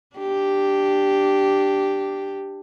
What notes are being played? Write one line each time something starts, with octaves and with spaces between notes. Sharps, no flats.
D4 G4